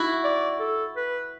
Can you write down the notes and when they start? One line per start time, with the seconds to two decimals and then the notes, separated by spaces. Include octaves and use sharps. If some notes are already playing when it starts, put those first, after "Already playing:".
Already playing: E4 F#4
0.24 D5
0.60 A4
0.96 B4